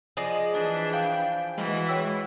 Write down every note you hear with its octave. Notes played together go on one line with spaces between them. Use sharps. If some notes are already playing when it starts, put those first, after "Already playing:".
F3 G#4 D5 D#5
E3 D4
F5 G5
E3 G#3 F#4
C#5 G5 E6